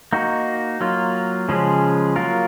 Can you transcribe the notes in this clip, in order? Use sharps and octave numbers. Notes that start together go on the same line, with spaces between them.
A#3 D#4 F#4
F#3 A#3 F4
C#3 F3 G#3 C#4 G#4
F#3 A#3 F4 A#4